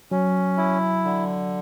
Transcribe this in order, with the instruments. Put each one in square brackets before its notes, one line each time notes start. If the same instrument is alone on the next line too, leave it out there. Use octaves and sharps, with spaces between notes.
[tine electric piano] F#3 [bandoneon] C#4
[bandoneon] E4
D3